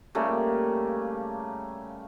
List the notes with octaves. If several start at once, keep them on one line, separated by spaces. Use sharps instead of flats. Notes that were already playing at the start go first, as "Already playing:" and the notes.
C#3 G3 A3 A#3